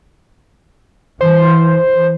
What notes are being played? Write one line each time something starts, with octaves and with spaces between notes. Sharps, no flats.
E3 C5